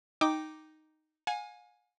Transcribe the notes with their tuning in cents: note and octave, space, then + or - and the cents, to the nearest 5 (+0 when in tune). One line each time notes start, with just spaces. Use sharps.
D#4 +0 G5 +0 D6 +0
F5 +45 G#5 +0